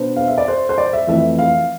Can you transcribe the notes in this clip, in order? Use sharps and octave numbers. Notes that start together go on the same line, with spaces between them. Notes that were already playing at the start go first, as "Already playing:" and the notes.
Already playing: B2 B3 D4 C5
F5
E5
D5
C5
C5
D5
E5
F2 E3 A3 E5
F5